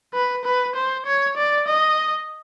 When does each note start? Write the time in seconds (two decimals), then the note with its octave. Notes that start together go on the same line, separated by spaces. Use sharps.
0.14 B4
0.45 B4
0.76 C5
1.06 C#5
1.37 D5
1.68 D#5